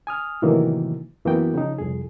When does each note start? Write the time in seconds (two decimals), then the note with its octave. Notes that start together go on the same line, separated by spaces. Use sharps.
0.07 G#5 D#6 F6
0.42 A2 C3 D#3 E3 F#3 A#3
1.25 F#2 E3 A#3 B3 F#4 G5
1.54 C#3 F3 D#4
1.78 C2 F2 G#4